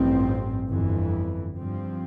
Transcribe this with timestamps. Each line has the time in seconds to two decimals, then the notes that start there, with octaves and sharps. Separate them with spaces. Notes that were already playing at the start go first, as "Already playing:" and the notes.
Already playing: A1 G2 F3 C4
0.69 G1 F2 E3
1.55 G2 F3 C4